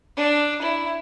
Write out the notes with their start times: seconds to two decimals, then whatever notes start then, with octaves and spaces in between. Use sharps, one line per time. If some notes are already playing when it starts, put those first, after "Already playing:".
0.17 D4
0.62 E4